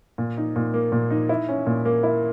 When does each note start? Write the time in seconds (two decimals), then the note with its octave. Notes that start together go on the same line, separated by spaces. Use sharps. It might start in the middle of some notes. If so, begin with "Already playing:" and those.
0.18 A#2
0.37 D#4
0.56 A#2
0.74 A#3
0.92 A#2
1.10 D#4
1.29 E4
1.49 C#4
1.67 A#2
1.85 A#3
2.03 E4